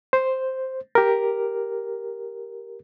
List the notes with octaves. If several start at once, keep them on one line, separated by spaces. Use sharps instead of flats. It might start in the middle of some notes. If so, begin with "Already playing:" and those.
C5
G4 A#4